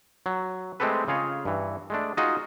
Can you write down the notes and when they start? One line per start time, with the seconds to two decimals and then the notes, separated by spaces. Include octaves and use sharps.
0.26 F#3
0.80 G#3 A3 C4 G4 A4 B4
1.08 C#3 F4 G#4 C#5 D#5
1.45 G2 E3
1.90 G#3 A3 D4
2.17 D#4 F4 F#4 G#4 D#5